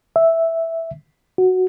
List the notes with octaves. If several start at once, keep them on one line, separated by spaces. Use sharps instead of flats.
E5
F#4